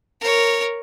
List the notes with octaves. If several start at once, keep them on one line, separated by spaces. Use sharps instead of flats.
A#4 C#5